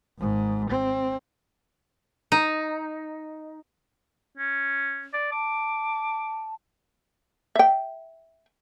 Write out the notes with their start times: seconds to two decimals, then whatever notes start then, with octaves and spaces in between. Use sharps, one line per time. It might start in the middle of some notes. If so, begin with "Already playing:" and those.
0.20 G#1 G#2
0.71 C4
2.32 D#4
4.38 C#4
5.14 D5
5.32 A5 D6
7.56 E5 G5